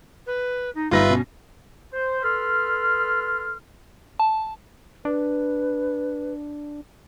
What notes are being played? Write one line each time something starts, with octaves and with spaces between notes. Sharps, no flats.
B4
D#4
G1 G3 D#4 F4 B4 E5 A#6
B2 C#4
C5
A4 B4 C6 F6
A5
D4 B4